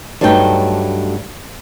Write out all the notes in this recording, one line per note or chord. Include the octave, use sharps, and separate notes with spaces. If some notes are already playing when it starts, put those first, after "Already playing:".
G2 F#3 A3 D#4 A4 G5